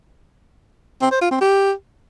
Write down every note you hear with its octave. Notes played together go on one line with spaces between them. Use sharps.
C4
C5
F4
C4
G4